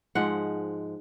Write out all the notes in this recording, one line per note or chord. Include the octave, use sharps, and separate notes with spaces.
G#2 F3 G#3 F#5